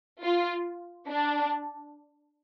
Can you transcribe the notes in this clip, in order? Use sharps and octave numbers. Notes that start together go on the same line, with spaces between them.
F4
D4